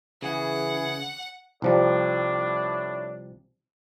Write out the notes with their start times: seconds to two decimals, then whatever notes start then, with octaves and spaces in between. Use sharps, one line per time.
0.22 C#3 E3 G#4 F#5
1.62 C2 A2 F3 G3 D4